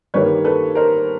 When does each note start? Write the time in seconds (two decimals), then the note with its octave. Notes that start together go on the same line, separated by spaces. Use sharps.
0.14 G2 D#3 G3 A#3 B4 C#5
0.44 A4 B4
0.75 A#4 C5